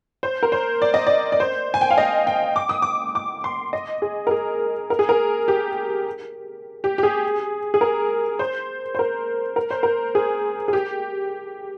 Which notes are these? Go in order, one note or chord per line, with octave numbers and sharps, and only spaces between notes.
C5
A#4
C5
D5
D#5
D5
D5
C5
G#5
G5
F5
D#5
G5
D6
D#6
D6
D6
C6
D#5
G#4
A#4
G#4
A#4
G#4
A#4
G4
G4
G4
G#4
G#4
A#4
C5
C5
A#4
A#4
C5
A#4
G#4
G#4
G4